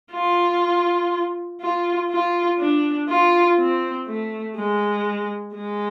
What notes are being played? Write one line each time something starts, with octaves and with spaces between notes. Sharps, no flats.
F4
F4
F4
D4
F4
C4
A3
G#3
G#3